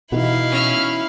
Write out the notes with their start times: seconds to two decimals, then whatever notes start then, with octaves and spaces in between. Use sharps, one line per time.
0.12 B2 E3 D#4 E4 F#4 F5
0.50 C#4 E5 F6